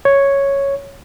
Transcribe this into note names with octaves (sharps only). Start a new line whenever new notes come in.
C#5